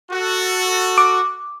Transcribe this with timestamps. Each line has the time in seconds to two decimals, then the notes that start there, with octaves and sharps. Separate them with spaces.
0.11 F#4 A4
0.98 D6